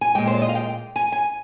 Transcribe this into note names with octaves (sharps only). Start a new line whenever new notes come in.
G#5
A#2 G#3 G5
C5
D5
D#5
F5
G5
G#5
G#5